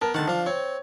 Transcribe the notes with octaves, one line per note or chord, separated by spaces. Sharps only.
B3 A#4 A5
D3 D#3 F#5 A5
F3 D4 F5
C4 C#5